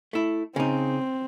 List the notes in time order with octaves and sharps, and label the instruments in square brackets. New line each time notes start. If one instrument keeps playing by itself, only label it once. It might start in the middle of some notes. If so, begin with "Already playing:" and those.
[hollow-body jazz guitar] A3 E4
[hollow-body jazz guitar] C#3 D#4 [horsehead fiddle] C4